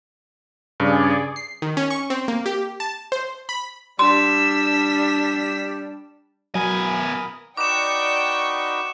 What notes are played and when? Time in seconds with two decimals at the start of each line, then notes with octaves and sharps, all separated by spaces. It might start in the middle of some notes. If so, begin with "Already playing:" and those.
0.80 G2 C#3 G#4 D5
1.36 C7
1.62 D#3
1.77 C#4
1.90 C#6
2.10 C4
2.28 A#3
2.46 G4
2.80 A5
3.12 C5
3.49 B5
3.99 G3 D4 C6 E6 B6
6.55 B2 F#3 A#4 G#5 B5 D#6
7.57 D#4 F#4 B4 D5 G5 C#6 D6 E7